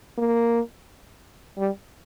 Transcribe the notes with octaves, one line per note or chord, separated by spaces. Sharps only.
A#3
G3